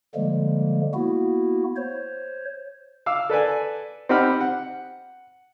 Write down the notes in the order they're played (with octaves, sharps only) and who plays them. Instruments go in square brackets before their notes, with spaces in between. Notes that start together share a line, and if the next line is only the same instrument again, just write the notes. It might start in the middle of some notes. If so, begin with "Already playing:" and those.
[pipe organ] D3 F3 G3 G#3 A#3
A#3 B3 E4 F#4
C5 C#5
[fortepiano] F5 D6 E6
A4 B4 D5 G#5
C4 D#4 G4 F#5 B5 F6
F#5